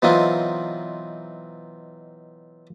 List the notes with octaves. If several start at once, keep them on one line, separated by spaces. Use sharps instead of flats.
B2 E3 F#3 C4 D#4 F4